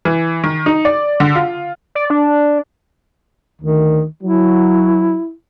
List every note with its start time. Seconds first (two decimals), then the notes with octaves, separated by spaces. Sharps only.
0.05 E3
0.44 D#3
0.66 D#4
0.85 D5
1.20 D3
1.35 F4
1.95 D5
2.10 D4
3.62 D2 D#3
4.23 F#3 E4